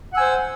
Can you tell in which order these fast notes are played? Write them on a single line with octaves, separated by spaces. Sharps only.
F#5 E6 G#5 C5